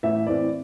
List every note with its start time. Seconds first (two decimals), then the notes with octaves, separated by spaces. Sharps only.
0.03 A1 E5
0.26 A2 E3 C4 D5